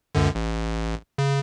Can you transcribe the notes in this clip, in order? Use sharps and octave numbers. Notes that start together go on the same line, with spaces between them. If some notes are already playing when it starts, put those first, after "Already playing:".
C#2 F#2 D3
A1
C#3